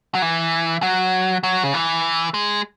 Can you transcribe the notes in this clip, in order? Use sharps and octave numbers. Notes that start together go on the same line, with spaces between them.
F#3
E3
F#3
F#3
C#3
E3
G#3